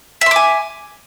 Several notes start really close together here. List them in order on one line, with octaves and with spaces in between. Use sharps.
E5 C6 D6 G#5